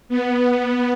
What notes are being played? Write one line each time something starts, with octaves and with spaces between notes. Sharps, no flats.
B3